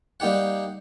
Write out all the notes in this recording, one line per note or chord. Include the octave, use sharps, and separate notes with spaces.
G3 A#3 D#4 G4 F#5